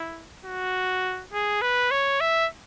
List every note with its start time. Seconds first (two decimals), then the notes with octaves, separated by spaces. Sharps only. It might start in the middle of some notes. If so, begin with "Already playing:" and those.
Already playing: E4
0.45 F#4
1.33 G#4
1.62 B4
1.91 C#5
2.21 E5